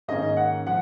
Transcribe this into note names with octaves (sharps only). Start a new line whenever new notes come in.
G#2 D#3 A#3 C#4 D#5
F#5
F3 F#5